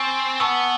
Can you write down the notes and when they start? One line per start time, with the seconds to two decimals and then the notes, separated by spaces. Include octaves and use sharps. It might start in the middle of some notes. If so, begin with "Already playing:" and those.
Already playing: C4 G#5 C#6 E6 A6
0.40 B3 A5 C#6 E6